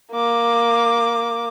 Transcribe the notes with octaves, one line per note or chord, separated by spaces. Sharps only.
A#3 D6